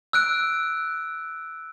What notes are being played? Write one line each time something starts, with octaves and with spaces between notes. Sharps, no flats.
E6 F#6 D7